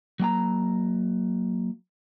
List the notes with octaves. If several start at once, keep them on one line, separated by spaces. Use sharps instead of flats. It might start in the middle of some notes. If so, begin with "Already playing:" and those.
F#3 A#3 G5 A#5